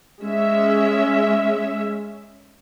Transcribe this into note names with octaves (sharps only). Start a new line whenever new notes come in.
G#3 C#4 E5